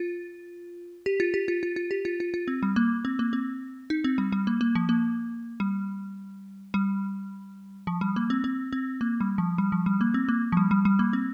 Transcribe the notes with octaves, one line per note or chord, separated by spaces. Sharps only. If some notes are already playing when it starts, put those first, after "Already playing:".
Already playing: F4
G4
F4
G4
F4
F4
F4
G4
F4
F4
F4
C4
G3
A#3
C4
A#3
C4
D#4
C4
G3
G3
A#3
A#3
F3
A#3
G3
G3
F3
G3
A#3
C4
C4
C4
A#3
G3
F3
G3
F3
G3
A#3
C4
A#3
F3
G3
G3
G3
A#3
C4